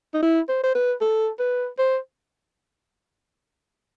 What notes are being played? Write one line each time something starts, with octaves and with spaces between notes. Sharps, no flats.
D#4
E4
C5
C5
B4
A4
B4
C5